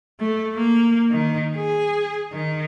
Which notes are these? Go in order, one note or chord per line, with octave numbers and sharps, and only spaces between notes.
A3
A#3
D#3
G#4
D#3